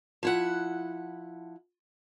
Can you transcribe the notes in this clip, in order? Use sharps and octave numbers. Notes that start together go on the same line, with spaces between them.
F3 E4 F#5